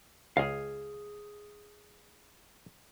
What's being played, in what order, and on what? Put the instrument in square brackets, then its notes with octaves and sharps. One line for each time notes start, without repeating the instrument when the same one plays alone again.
[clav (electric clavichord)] C#2 [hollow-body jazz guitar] G#4 F5